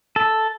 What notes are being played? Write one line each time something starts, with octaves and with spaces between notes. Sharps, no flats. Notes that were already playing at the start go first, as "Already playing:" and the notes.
A4